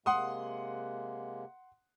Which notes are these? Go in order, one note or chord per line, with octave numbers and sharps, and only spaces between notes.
C3 G#3 A#3 F#5 C6 D#6